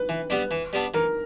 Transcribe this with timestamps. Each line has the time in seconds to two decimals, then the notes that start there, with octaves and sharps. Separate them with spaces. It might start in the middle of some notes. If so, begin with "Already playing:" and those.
Already playing: B4
0.09 E3
0.30 G3 B3 D4
0.51 E3
0.73 G3 B3 D4
0.94 E3 A#4